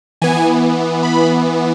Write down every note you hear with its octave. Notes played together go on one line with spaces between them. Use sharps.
E3 B3 G#5
B5